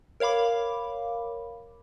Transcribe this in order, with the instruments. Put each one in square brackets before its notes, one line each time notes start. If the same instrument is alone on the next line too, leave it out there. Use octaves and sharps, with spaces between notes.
[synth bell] A#4 C#5 F5 B5 D6